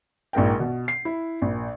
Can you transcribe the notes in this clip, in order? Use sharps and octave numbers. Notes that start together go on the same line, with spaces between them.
A#1 G#2 A#4 G5
B2
C7
E4
A#1